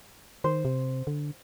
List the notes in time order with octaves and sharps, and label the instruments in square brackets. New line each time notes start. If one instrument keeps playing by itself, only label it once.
[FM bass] D#3 [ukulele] C5
[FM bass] C3
D3